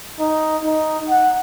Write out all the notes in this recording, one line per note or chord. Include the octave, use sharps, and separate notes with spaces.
D#4
D#4
F#5